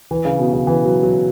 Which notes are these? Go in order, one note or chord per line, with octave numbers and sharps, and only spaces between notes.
E3
C#3
B2
C#3
E3
F#3
F#3